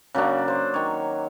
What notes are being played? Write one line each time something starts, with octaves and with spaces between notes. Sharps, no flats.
C#3 F#3 A#3 D4
C5
D#3 C#5